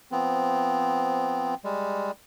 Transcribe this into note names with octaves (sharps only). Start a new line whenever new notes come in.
F3 B3 C4
G3 G#3